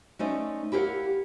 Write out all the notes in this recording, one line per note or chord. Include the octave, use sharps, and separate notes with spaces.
A3 C#4 D#4 C5 D5
E4 G4 A#4 C5 F5 F#5